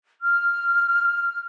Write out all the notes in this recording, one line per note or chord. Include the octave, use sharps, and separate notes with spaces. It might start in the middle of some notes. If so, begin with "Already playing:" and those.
F6